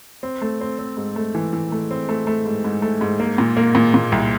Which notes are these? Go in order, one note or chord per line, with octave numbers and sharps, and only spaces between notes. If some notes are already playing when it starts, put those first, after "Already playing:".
C4
A3
C4
C4
G#2
A3
E3
E3
A3
C4
A3
A3
G#2
G#2
A3
G#2
A#3
A#2
A#3
A#2
A#2
C2